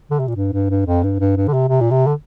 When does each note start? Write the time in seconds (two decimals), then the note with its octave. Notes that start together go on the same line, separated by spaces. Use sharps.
0.11 D3
0.19 C3
0.28 A#2
0.36 G2
0.53 G2
0.70 G2
0.86 F2
1.03 G2
1.20 G2
1.36 G2
1.48 D3
1.53 C3
1.69 C3
1.81 A#2
1.91 C3
2.07 D3